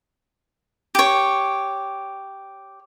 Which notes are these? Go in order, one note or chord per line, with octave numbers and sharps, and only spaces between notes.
G4 C#5